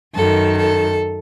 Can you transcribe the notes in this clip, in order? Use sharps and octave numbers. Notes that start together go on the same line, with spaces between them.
F#2 D#3 A4
A4